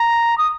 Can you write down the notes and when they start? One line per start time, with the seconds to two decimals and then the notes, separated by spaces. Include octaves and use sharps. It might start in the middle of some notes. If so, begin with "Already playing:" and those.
Already playing: A#5
0.38 D#6